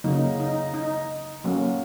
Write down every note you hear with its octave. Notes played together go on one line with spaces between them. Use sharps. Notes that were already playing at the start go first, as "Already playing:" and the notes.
C#3 F#3 A#3 D#4
D#4
D#4
F#3 A#3 C#4